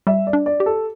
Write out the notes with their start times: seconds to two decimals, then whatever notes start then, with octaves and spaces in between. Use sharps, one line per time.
0.07 G3 E5
0.27 D5
0.33 D4
0.46 D5
0.60 G4
0.66 A4